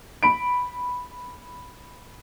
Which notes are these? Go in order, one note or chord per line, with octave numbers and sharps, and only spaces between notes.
B5 D7